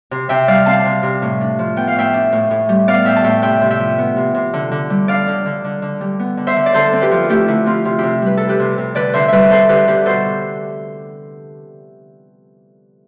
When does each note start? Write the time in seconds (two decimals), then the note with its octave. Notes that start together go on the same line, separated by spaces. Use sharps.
0.11 C3
0.29 C3 E5 G5
0.48 G3 D5 F5
0.66 C4 F5 A5
0.85 C3
1.03 C3
1.22 A2
1.41 D4
1.59 F3
1.76 B3 G5
1.88 F5
1.96 A2 E5 G5
2.14 D4
2.32 A2
2.51 A2
2.69 G3
2.88 B3 D5 F5
3.04 A2 E5 G5
3.16 A5
3.24 A2 E5 G5
3.42 C3 E5 G5
3.61 C3
3.71 E5 G5
3.79 F3
3.98 B3
4.16 C3
4.35 C3
4.53 D3
4.72 D3
4.90 G3
5.08 D4 D5 F5
5.28 D3
5.46 D3
5.65 D3
5.82 D3
6.01 G3
6.19 B3
6.37 D3
6.47 C5 E5
6.56 D3
6.66 D5
6.74 D3 A4 C5
6.93 C4
7.02 G4 B4
7.11 F3
7.29 A3 E4 G4
7.48 D3 E4
7.66 C4 F4
7.85 C3 F4
7.98 C3 E4 G4
8.22 G3 B4
8.37 D4 A4
8.49 G4 B4
8.59 C3
8.78 C3
8.95 D3 B4 D5
9.14 D3 C5 E5
9.28 G3 B4 D5 E5
9.50 C4 A4 C5
9.69 D3 G4 B4
9.87 D3 G4 B4
10.06 B2 A4 C5